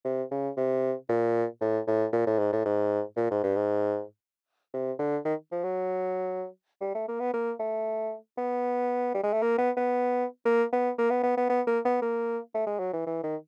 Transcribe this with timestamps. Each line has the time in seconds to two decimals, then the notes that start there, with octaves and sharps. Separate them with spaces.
0.05 C3
0.31 C#3
0.57 C3
1.09 A#2
1.61 A2
1.88 A2
2.13 A#2
2.27 A2
2.39 G#2
2.53 A2
2.66 G#2
3.17 A#2
3.31 G#2
3.44 G2
3.56 G#2
4.74 C3
4.99 D3
5.25 D#3
5.52 F3
5.64 F#3
6.81 G3
6.95 A3
7.08 A#3
7.20 B3
7.34 A#3
7.60 A3
8.38 B3
9.14 G3
9.24 G#3
9.33 A3
9.42 A#3
9.58 B3
9.77 B3
10.46 A#3
10.72 B3
10.98 A#3
11.11 B3
11.23 B3
11.37 B3
11.50 B3
11.67 A#3
11.85 B3
12.02 A#3
12.55 A3
12.67 G#3
12.79 F#3
12.93 E3
13.07 E3
13.24 D#3